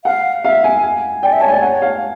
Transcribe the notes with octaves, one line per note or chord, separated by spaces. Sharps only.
F5 F#5
E5 F5
G#5
G#5
D5 G5
E5
C#5 A5
G#5
D5
G5
C#5 F#5
F5